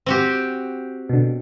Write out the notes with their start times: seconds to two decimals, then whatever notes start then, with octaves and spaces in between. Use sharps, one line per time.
0.06 C4 F#4 G4
1.09 B2 D3